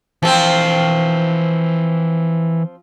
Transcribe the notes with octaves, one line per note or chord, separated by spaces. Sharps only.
E3 F3 C4 G5